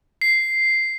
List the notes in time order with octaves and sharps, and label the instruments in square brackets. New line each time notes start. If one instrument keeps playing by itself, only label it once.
[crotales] C7